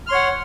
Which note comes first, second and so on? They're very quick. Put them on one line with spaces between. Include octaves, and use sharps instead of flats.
F6 C6 C#5 F#5